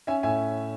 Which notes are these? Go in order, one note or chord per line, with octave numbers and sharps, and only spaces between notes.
C#4 E5 G#5
A2 E5 G#5